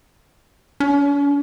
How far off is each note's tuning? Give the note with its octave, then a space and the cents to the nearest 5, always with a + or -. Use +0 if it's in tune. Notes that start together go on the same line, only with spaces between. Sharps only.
C#4 +45